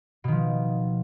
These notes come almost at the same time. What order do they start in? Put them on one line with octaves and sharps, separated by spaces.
B2 D#3 F3